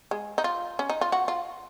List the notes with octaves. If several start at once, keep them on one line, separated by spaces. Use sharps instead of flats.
G#3
D#4
F4
C#4
D#4
F4
F#4
F4